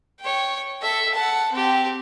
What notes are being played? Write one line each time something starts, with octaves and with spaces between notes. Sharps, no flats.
C#5 G5
A4 E5
F#5 A5
C4 G4